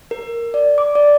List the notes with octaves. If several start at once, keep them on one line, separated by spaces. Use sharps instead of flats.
A#4
D5
D6
D5